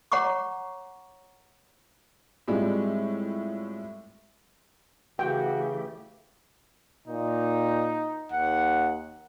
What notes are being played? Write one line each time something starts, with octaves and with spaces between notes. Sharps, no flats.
C#5 F#5 A#5 C#6 D6
A2 G3 G#3 C4 F4
C#3 E3 A3 F#4 G4 G5
A#2 D#4
D#2 F#5